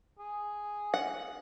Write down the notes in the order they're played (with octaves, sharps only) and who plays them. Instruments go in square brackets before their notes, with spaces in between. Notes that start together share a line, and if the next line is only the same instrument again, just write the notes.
[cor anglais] G#4
[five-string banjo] F#5